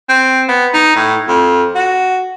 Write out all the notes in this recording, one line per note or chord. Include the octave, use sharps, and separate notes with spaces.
C4
B3
D#4
A2
F2
F#4